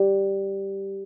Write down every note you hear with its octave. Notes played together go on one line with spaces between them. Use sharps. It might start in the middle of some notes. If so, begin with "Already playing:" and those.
Already playing: G3